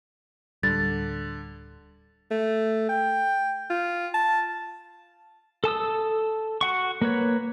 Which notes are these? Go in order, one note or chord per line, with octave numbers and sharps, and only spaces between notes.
D1 D3 G3 A6
A3
G5
F4
A5
A4 A5 D#6 E6
F#4 F#5 C#6
A#3 B4 C#5